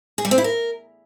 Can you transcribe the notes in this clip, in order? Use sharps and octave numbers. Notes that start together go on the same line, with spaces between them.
G#4
G3
C4
E4
A#4